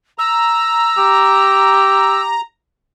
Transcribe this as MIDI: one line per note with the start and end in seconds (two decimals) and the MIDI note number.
0.18 2.41 82
0.18 2.22 88
0.98 2.36 67